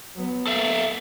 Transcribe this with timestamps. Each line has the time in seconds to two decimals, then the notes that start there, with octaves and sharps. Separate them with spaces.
0.16 F#3 B3
0.47 A#3 A4 E5 F5